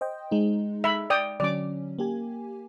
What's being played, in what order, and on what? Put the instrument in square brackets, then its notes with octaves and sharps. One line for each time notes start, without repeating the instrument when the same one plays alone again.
[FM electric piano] C5 D#5 G5
G#3 D#4
[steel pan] E5 B5
D5 G5 D#6
[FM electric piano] D3 F#3 C#4 [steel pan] D5 D6
[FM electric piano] A#3 G4 G#5